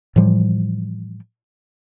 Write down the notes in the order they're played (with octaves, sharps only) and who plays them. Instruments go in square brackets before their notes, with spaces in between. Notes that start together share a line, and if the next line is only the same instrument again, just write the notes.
[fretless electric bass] A2 E3 F3 G3